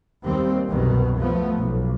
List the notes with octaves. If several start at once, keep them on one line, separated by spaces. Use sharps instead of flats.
D#2 G3 C4
C2 F#2 B2 D#3
F3 A3 B3
B1